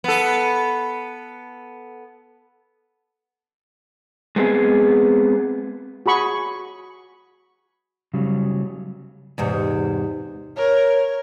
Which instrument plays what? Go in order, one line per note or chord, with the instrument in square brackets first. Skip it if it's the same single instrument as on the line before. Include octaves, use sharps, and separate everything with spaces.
[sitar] B3 A4
[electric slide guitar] G#3 B3 C4 G#4
[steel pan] F#4 G#4 B5 C#6
[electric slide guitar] C#3 F#3 G3
[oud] E2 G#2 C3
[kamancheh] A#4 [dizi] C#5